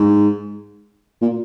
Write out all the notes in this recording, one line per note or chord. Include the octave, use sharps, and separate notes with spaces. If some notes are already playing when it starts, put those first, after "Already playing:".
Already playing: G#2
A#2